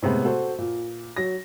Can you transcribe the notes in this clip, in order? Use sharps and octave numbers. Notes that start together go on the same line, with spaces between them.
A2 C3 G#3 B3
F#4 A4 C5
A#2
F#3 A#6